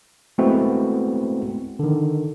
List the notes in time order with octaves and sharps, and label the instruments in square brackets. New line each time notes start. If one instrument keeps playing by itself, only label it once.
[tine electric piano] G#3 A3 B3 C4 E4 F#4
D3 D#3